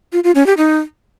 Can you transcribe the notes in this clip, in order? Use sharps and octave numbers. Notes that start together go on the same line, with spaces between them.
F4
F4
C#4
G4
D#4